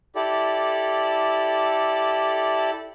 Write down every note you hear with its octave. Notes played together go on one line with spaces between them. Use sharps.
E4 G4 A4 D5